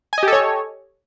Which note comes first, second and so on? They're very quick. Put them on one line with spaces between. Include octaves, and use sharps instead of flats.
G#5 D#5 G4 A4 C#5